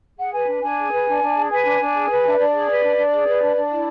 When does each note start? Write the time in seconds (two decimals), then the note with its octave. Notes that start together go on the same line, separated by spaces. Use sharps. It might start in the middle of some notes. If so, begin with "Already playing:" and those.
0.19 G#4 F#5
0.33 B4 G#5
0.48 D4
0.63 D4 G#5
0.77 G#4
0.92 B4
1.06 D4
1.22 D4
1.36 G#4
1.50 B4 G#5
1.65 D4
1.80 D4
1.94 G#4
2.09 B4
2.24 D4 E5
2.38 D4 D5
2.53 G#4
2.67 B4
2.82 D4
2.97 D4
3.11 G#4
3.26 B4
3.41 D4
3.55 D4
3.70 E4